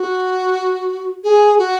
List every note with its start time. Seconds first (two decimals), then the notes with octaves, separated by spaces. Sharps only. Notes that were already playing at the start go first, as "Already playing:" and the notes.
Already playing: F#4
1.24 G#4
1.58 F#4